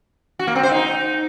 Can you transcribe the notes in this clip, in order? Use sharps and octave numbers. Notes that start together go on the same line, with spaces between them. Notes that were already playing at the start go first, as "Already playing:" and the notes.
F#4
A#3
C4
C5
D#4